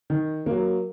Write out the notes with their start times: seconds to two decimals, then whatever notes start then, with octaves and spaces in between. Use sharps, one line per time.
0.10 D#3
0.46 F#3 A#3